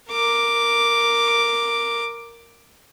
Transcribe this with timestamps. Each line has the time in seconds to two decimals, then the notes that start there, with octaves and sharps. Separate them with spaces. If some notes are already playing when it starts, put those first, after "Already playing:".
0.11 A#4 D6